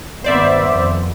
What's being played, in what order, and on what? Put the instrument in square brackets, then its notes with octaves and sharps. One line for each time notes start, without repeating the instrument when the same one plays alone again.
[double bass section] G2 D#3 B3 [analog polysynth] C5 D5 E5
[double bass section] F2